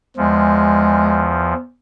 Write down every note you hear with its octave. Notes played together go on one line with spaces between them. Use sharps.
E2 F3 G#3